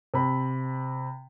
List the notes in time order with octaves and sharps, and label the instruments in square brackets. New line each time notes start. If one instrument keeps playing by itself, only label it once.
[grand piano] C3 B5